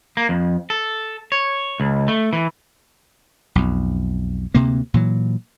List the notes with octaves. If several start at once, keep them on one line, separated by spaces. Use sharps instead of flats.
A#3
F2
A4
C#5
C#2
A3
E3
B1 F2
D2 C3 A#3
A#2 E3 F#3